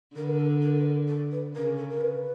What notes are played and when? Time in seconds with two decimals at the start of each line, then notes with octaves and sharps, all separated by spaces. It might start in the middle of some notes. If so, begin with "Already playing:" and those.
0.16 D3 A#4
0.23 B4
0.31 A#4
0.39 A4
0.62 A#4
0.78 B4
0.85 A#4
1.08 A4
1.32 B4
1.54 C#3 A#4
1.77 A4
1.90 A#4
2.01 B4